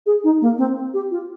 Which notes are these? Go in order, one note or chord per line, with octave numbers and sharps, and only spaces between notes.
G#4
D#4
A#3
C4
G4
F4